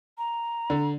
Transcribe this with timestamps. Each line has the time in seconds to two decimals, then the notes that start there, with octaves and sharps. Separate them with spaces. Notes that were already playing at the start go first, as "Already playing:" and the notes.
0.18 A#5
0.70 D3